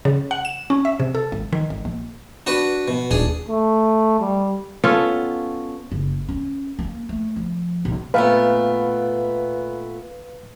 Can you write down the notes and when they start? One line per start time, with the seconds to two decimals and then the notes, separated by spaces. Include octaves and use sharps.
0.05 C#3
0.31 F#5
0.45 E7
0.70 C#4
0.85 E5
1.00 C3
1.15 A4
1.32 G#1
1.53 D#3
1.70 G#1
1.85 A#1
2.47 D4 F#4 B4
2.88 B2
3.11 D#1 D4 G#4
3.48 A3
4.20 G3
4.84 B3 C#4 F4 A4
5.92 F#1
6.29 C#4
6.79 A#3
7.09 A3
7.36 F3
7.85 B1
8.14 A#2 A3 B3 B4 F5